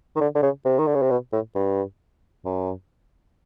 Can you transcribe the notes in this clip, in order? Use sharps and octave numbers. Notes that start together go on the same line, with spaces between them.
D#3
D3
D3
C#3
C3
D#3
D3
C#3
C3
B2
A2
G2
F#2